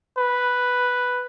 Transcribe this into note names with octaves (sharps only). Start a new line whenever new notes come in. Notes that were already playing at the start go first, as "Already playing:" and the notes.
B4